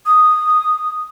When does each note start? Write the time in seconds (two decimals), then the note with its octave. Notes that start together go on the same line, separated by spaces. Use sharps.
0.06 D#6